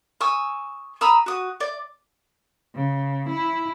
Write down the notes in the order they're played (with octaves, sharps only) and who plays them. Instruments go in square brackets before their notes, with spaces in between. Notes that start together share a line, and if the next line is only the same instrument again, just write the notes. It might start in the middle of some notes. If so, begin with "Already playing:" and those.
[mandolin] G#5 C#6 D#6 E6
A#5 B5 D#6 E6
F#4 D#6
D5
[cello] C#3
E4